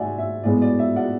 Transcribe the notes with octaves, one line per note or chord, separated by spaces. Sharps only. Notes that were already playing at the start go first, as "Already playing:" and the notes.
Already playing: G#1 D5 E5 F#5 G#5
E5
A2 G#3 B3 D5
D5
E5
D5 F#5